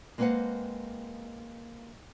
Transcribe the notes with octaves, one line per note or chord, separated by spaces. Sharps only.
G#3 A#3 C4 B4 F5 F#5